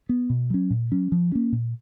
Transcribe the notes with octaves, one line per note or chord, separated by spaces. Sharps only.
B3
B2
F#3 C#4
A#2
F#3 C#4
F3
A#3 C#4
A#2